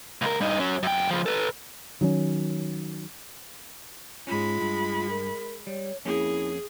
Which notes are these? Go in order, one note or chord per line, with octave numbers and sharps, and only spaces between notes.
C#2 A#4
G2 D#4
F#3 C#4
F#2 G5
C#3 F3
A4 B4
D#3 F#3 B3 C#4
G#2 G#3 C#4 F4 B5
G2
A#4
G3 C#5
F2 A#3 C#4 E4 G#4